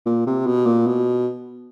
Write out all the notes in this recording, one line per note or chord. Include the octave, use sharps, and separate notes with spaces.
A#2
C3
B2
A#2
B2